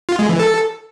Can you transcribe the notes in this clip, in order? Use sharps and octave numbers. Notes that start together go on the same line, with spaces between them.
F4
G#3
E3
A4